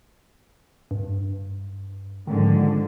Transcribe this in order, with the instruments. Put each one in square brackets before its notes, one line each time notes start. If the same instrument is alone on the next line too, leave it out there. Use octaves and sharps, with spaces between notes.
[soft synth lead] G2
[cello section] G#2 D3 F3 [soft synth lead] D#3